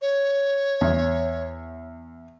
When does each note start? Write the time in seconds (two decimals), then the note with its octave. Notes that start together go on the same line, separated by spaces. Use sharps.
0.02 C#5
0.81 E2